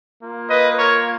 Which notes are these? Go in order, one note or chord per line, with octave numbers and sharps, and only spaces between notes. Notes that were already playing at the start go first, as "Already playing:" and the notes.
A#3 F4
B4 D#5
A#4 C#5